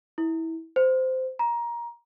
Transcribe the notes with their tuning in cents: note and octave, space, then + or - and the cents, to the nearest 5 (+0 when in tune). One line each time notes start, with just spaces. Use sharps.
E4 -20
C5 -15
A#5 +20